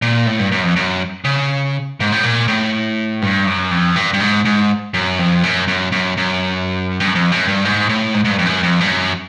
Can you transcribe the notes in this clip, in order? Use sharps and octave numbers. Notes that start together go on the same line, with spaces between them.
A#2
A2
G2
F#2
F2
F#2
C#3
G#2
A2
A#2
A2
G2
F#2
F2
G2
G2
G#2
G#2
F#2
F2
F#2
F#2
F#2
F#2
G2
F#2
F2
F#2
G2
G#2
A2
G#2
G#2
G2
F2
F#2
F2
G2
F#2